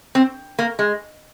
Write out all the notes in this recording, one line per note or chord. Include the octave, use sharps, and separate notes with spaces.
C4
A#3
G#3